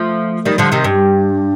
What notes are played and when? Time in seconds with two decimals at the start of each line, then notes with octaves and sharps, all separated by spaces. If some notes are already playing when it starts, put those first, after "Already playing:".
Already playing: F3 A3
0.45 D#3 G3
0.58 D3 F3
0.72 C3 D#3
0.84 G2